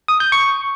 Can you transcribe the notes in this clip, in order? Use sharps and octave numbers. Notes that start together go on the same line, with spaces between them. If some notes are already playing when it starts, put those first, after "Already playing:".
D#6
G6
C#6